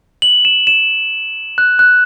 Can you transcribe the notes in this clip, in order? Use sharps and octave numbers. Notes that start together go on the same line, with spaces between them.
F#7
E7
E7
F#6
F#6